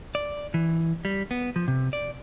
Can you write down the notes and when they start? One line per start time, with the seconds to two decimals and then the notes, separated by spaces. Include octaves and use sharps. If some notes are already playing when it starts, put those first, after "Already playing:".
0.15 D5
0.54 E3
1.05 G3
1.31 B3
1.56 F3
1.68 C3
1.93 D5